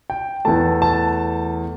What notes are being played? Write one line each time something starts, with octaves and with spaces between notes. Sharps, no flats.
G5
E2 E3 A3 A5
A5